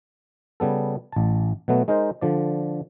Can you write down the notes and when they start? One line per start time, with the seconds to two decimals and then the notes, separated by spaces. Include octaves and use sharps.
0.60 C#3 G3 B3 A4
1.12 A1 A5
1.68 B2 F#3 A3 B3
1.88 G#3 D#4 A#4 C5
2.21 D3 F3 D5